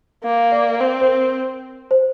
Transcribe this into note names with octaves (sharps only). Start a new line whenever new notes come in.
A#3
D5
C4 C5
C5
A#4
C5